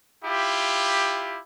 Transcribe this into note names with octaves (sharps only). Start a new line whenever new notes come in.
E4 F4 G4